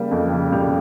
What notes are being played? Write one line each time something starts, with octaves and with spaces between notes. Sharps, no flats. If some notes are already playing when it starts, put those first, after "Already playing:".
Already playing: C#3 G3 A#3
F2
C#3
G3